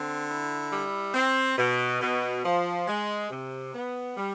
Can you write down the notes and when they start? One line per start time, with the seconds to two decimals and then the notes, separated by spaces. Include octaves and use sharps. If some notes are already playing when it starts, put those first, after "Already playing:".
Already playing: D3 C4
0.28 E4
0.71 G3
1.15 C4
1.58 B2
2.01 B2
2.44 F3
2.87 G#3
3.30 C3
3.74 B3
4.17 G3